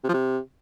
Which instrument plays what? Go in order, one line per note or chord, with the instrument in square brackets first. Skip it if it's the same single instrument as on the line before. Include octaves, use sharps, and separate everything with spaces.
[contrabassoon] C3
F3
C3